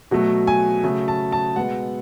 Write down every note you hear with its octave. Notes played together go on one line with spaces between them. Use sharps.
B2 F#3 A3
G#5
C#3 F#3 A3
A5
A5
B2 G#3 B3 F#5